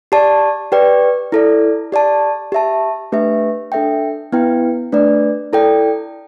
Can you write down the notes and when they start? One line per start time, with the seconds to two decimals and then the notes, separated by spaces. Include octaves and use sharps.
0.12 G4 D5 A5
0.72 G4 B4 D5 G5
1.32 E4 A4 D5
1.92 G4 D5 A5
2.52 G4 E5 A5
3.12 A3 D4 G4 B4 E5
3.72 D4 A4 E5 G5
4.32 B3 E4 B4 G5
4.92 A3 D4 B4 D5
5.53 E4 A4 D5 G5